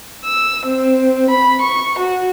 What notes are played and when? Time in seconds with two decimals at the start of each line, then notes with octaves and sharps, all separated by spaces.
0.25 E6
0.66 C4
1.30 B5
1.62 C#6
1.99 F#4